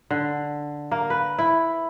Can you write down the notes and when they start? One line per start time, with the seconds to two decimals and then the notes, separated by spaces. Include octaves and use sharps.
0.10 D3
0.91 A#3
1.10 B4
1.39 E4